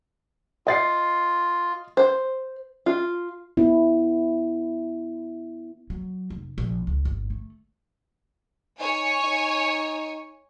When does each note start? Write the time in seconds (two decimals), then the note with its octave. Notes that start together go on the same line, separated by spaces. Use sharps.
0.67 F4 D#5 A6 C7
1.97 C5
2.86 F4
3.57 B3 E4
5.90 F#3
6.30 F1
6.58 A#1
6.87 C#2
7.05 G1
7.30 A3
8.80 D#4 C#5 G#5
9.24 D#4